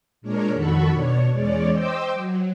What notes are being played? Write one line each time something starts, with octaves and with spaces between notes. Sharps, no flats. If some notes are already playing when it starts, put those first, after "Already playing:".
A#2 G#3 D4 A#4 C#5
F2 D#3 F#4 A4 B5 C#6
B2 D4 C#5
E2 G#3 C#4 C#5 D5
C5 D#5 G5 C6 D6 E6
F#3